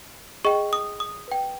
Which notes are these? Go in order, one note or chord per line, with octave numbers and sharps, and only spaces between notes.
G#4 D#5 G5 C#6
D#6
D#6
B4 G5